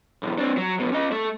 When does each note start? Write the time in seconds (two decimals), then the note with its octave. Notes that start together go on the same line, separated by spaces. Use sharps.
0.23 B1 E2
0.38 C4 D4
0.57 F#3
0.79 F2 B2
0.92 C#4 D#5
1.12 A3